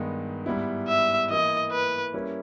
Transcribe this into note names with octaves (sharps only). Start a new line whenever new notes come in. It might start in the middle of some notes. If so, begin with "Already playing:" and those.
Already playing: G2 D#3 G#3 B3 D#4
G#2 G3 B3 E4
E5
E3 A#3 E4 D#5
B4
G3 A#3 C#4 E4